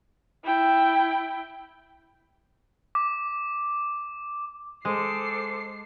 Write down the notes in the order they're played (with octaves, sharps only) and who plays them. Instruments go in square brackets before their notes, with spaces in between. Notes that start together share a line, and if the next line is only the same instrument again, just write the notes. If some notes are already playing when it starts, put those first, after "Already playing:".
[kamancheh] E4 G5
[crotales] D6
[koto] G#3 [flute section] A4 C5 D6 [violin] C7